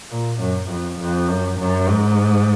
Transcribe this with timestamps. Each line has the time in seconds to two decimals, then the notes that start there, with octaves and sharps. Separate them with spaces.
0.10 A#2
0.40 F#2
0.70 F2
1.00 F2
1.29 F#2
1.59 F#2
1.89 G#2